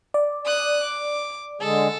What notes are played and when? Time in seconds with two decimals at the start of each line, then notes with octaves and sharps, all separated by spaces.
0.14 D5
0.46 D#6 F#6
0.85 D6
1.61 D3 G#3 G#4 A4